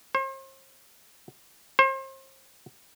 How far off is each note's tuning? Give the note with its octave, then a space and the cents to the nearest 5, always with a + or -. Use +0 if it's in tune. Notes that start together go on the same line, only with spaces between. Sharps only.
C5 +40
C5 +35